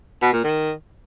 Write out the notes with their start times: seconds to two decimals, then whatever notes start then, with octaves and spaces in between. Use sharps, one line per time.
0.22 B2
0.33 A#2
0.44 D#3